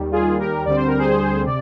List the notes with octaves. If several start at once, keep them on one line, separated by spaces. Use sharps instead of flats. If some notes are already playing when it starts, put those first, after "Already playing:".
Already playing: D#2 D#3 G3
F4 G#4
G4 A#4
D2 D3 G3 C4 D5
C5
A#4
G#4 C5
C3 D5